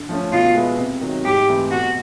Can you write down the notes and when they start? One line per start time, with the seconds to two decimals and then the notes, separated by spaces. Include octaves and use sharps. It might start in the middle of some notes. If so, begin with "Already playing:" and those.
Already playing: D3
0.09 F3 A3 C#4
0.32 B2 F4
0.55 G#3 B3 E4
0.79 C3
1.01 D#3 F#3
1.25 G#2 G4
1.48 E3 A3 C4 E4
1.71 B2 F#4